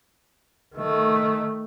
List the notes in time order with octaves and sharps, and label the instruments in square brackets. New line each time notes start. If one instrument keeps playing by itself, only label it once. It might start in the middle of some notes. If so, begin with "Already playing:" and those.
[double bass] D#3 A3